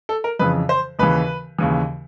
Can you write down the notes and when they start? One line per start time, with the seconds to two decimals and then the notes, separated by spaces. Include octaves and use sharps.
0.09 A4
0.24 A#4
0.39 F2 C#3 E3 B4
0.69 C5
0.99 D#2 C#3 E3 B4
1.59 D#2 C#3 E3